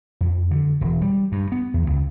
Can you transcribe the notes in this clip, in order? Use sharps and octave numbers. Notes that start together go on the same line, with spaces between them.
F2
D3
E1
G3
G2
B3
E2
C#2